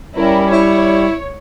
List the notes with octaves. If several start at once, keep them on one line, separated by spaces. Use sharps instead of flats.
G3 C#4 E4 A#4
E4 C#5